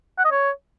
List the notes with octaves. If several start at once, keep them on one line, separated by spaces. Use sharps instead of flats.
F#5
D#5
C#5